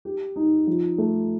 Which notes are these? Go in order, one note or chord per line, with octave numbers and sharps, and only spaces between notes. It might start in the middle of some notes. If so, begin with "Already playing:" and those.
G4
D#4
F3
A3